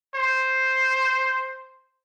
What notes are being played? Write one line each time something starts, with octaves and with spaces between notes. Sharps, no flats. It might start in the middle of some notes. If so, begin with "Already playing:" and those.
C5